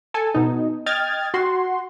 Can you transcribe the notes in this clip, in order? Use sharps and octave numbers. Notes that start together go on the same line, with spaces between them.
A4 G#5
B2 D#4
D#5 G5 F6 G#6 A6
F#4 C6